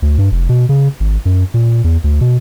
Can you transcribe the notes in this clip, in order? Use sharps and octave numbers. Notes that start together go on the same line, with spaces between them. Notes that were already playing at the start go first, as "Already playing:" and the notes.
D2
G2
F1
B2
C#3
G#1
F#2
A#2
E2
D2
B2